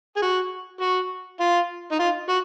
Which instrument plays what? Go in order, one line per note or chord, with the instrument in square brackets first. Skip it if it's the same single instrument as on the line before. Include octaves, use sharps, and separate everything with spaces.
[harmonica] G#4
F#4
F#4
F4
D#4
F4
F#4